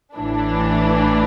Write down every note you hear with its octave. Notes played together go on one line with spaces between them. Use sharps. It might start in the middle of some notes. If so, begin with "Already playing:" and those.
A1 A2 E3 D4